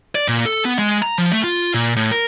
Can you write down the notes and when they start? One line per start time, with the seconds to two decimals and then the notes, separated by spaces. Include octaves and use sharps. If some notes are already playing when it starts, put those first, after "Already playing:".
0.15 D5
0.28 A#2
0.45 A4
0.65 B3
0.79 G#3
1.02 A#5
1.18 F3
1.32 A3
1.44 F4
1.74 A#2
1.96 A2
2.11 A#4